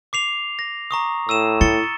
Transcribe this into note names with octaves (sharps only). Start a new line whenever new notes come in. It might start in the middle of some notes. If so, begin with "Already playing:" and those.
D6 C7 F7
A#6
A#5 C#6 D#6
A2 E6 D#7 E7
E4 A6 C#7 G7